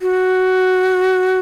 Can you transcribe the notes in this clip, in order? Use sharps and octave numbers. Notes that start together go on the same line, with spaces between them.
F#4